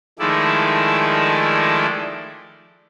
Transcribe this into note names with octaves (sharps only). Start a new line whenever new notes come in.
D#3 F3 G#3 A3 E4 D5